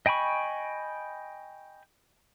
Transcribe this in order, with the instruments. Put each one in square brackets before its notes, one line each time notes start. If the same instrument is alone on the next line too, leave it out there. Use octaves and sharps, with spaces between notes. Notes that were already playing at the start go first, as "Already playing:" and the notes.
[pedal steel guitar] D#5 G5 G#5 B5 C#6